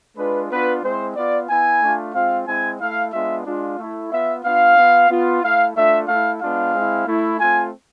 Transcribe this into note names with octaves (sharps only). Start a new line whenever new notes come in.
G#3 D4 F4 B4
B3 D4 F4 B4
G#3 C4 E4 C5
B3 F4 D5
B3 E4 G#5
A3 D4 F4
G#3 C4 F4 F5
G#3 C4 E4 G#5
A3 E4 F5
G#3 B3 D4 F4 E5
G#3 D4 F4
A3 E4
B3 F4 E5
B3 D4 F4 F5
B3 F4
B3 F4
A3 E4 F5
A3 D4 F4 E5
A3 E4 F5
G#3 B3 D4 F4 F5
G#3 C4 E4
A3 E4
A3 C4 F4 G#5